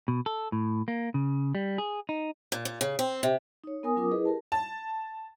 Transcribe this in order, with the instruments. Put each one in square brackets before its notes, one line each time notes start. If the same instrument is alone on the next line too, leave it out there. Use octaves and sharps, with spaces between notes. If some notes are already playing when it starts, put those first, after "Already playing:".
[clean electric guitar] B2
A4
A2
A#3
C#3
G3
G#4
D#4
[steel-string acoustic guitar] A#2
A#2
C#3
C4
C3
[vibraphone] D#4 C#5
B3 A#4 G#5 D#6
F#3 C#4 F4 A#4 D6 D#6
E4 G#4 B4 D#5
G4 A#4 A5
[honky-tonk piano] A5